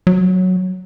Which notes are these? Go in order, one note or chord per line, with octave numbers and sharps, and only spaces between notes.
F#3